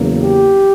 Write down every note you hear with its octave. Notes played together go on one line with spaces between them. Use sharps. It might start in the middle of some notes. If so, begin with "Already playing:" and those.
Already playing: E2 C#3 F#3 A#3
G4